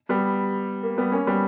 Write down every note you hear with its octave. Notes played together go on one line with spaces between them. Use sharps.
G3 B3
A#3
G3 B3
A#3 C#4
G3 B3